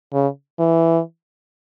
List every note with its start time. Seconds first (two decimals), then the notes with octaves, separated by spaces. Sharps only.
0.13 C#3
0.59 E3